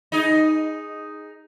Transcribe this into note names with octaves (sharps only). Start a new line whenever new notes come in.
D#4 G#4